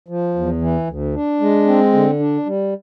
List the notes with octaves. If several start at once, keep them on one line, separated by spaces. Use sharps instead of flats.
F3
E2
E3
D2
D4
G#3
C4
D3
D4
G3